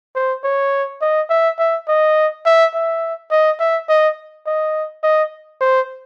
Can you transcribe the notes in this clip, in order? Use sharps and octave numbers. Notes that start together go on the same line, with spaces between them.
C5
C#5
D#5
E5
E5
D#5
E5
E5
D#5
E5
D#5
D#5
D#5
C5